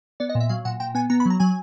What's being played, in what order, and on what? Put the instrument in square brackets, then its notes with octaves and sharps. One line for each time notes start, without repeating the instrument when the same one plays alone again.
[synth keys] B3 D5
D#5
A#2
E5
F#3 F5
A#2 F#5
A#2 G5
B3 G#5
B3 A#5
B5
F#3 A#5
F#3 G#5